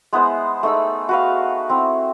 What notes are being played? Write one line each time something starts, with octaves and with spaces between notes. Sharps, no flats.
G#3 B3 E4 C5
A3 D#4 G#4 E6
F#4 B4 F5
C4 E4